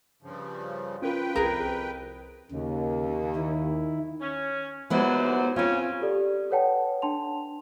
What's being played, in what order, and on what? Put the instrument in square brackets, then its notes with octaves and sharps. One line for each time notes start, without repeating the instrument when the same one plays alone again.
[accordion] G2 C#3 F3
[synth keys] C#4 A#4 [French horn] F4 [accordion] B4 G5
[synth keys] C2 B5 [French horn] F2 [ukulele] G#4 A#4
[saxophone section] D#2 [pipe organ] C#3
[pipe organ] D#3 E4
[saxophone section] C#4
[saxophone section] D#2 F#3 C5 [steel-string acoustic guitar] G#3 B3 E4
[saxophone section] C#3 C#4 [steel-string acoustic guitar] C4 F4
[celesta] G4 A4 D5
A4 B4 C#5 F#5 G5 A5
D4 G5 A5 C6 F7